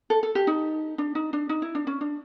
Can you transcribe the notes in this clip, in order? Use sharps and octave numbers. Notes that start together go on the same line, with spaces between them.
A4
A4
G4
D#4
D4
D#4
D4
D#4
E4
D4
C#4
D4